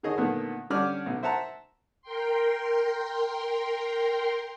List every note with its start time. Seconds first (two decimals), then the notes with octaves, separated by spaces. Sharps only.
0.03 D3 D#3 G#4 C#5 D#5
0.18 A#2 D3 D#3 A3 B3
0.70 D3 G3 C#4 D5 D6 F6
1.06 B1
1.23 C5 E5 F#5 A5 A#5
2.02 A#4 G5 C6